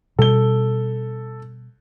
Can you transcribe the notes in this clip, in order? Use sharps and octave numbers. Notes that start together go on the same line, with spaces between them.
B2 G3 A4 G7